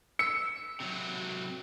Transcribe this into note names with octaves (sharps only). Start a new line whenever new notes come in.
E6 C#7
C3 F#3